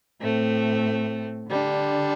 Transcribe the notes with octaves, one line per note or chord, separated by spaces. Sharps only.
A2 A3 C4
D3 G3 D4